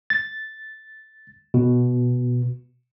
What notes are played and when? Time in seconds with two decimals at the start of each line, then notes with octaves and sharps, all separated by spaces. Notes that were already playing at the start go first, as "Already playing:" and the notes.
0.10 A6
1.54 B2